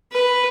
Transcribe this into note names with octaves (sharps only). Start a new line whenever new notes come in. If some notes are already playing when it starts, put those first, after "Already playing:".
B4